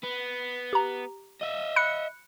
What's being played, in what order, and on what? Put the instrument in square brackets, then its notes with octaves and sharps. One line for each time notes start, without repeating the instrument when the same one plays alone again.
[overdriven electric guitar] B3
[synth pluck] G4 A#5
[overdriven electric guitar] D#5 E5
[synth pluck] B5 F#6 C#7